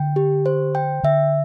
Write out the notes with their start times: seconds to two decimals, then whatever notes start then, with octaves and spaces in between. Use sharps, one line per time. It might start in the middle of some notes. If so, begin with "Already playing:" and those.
Already playing: D3 G5
0.16 G4
0.46 C5
0.75 G5
1.03 D3 E5